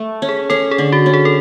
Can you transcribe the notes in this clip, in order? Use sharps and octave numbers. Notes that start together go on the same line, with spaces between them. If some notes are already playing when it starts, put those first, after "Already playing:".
Already playing: A3
C#4
G#4
C#4 A4
G#4
D3
F#4
C#4
G#4
A4